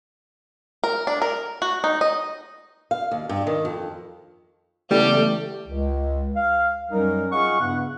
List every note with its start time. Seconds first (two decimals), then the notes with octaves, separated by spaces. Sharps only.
0.84 A#4
1.07 D4
1.22 A#4
1.62 F#4
1.84 D#4
2.01 D#5
2.91 F5
3.11 D#2
3.29 G2
3.47 D#3
3.65 F2
4.91 C#3 E3 G3 A3 B3 G4
5.68 C#2
6.36 F5
6.92 F#2 F#3 G3 C#4 D#4 A#4
7.32 F4 G#4 D#5 F5 F#5 C#6
7.60 G2 C#3 B3 E4 F#5